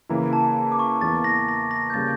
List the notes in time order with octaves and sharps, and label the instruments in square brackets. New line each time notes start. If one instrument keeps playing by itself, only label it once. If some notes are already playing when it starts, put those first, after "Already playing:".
[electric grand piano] C#3 E3 A#3 E4 [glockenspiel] A#5
[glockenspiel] A5
D6
C#6
[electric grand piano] E2 E3 A#3 E4 [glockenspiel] A6
[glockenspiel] A#6
A#6
A#6
G6
[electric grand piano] C#3 G3 A#3 [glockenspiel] A6